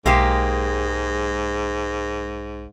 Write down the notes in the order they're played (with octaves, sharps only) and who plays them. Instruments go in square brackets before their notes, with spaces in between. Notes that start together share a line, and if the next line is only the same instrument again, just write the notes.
[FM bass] B1 [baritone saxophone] G#2 [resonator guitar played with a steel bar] G#3 A#3 G4